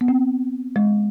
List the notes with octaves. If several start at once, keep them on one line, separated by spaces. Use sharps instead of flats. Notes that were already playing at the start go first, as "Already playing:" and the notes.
B3
C4
G#3